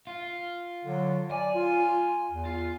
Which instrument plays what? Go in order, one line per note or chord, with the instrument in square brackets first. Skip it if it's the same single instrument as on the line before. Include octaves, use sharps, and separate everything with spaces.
[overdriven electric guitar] F4
[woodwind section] D3 F#3
[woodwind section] D5 [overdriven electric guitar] G#5
[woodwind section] F4
E2
[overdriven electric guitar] F4